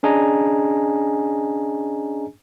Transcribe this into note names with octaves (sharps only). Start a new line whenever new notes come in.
C#4 D4 G#4 D#5 G#5 A#5